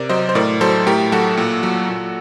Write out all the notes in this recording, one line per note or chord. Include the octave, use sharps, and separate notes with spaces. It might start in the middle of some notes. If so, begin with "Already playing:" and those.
Already playing: C3 A#4 D5
F#3 C5 D#5
C5
A2 A#4 D5
F#3 A4 C5
A2 G4 A#4
F#3 F#4 A4
A#2
F#3
A#2